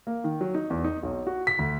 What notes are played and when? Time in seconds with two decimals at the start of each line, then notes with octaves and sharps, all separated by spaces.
0.07 A#3
0.24 D#3
0.41 F#3
0.55 D#4
0.70 E2
0.84 D#4
1.03 B1
1.27 F#4
1.47 B6
1.59 D2